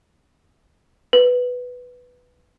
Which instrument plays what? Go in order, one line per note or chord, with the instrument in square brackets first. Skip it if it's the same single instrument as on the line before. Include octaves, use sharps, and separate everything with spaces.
[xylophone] B4